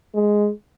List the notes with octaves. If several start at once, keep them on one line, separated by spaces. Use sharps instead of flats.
G#3